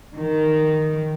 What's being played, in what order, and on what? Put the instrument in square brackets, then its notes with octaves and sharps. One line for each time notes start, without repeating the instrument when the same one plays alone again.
[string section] D#3